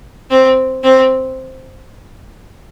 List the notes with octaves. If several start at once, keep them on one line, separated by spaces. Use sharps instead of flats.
C4
C4